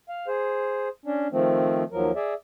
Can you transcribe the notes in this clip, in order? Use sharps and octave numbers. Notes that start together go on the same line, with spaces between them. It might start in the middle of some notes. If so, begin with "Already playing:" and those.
F5
G#4 C5
C#4 D4
D#3 F3 A3 C4
D#2 F3 F#3 A#4
G#4 D5 E5